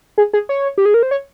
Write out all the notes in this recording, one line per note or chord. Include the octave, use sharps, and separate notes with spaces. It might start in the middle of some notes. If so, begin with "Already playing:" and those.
G#4
G#4
C#5
G4
G#4
A#4
C5
C#5